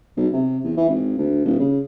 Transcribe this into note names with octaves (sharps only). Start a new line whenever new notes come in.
B1
C3
E2
E3
G#1
D2
D#1
C#3